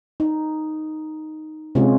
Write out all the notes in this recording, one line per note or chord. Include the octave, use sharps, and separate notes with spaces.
D#4
C3 G#3 C#4 F4